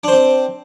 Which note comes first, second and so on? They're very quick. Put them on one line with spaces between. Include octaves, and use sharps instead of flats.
D4 C5 C4